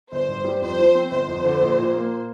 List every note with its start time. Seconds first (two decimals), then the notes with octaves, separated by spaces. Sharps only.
0.12 G1 C5
0.29 G2
0.45 G3
0.61 F2 C5
0.79 F3
0.95 C4
1.11 G1 C5
1.28 F2
1.44 D3
1.61 A#1
1.78 A#2
1.94 A#3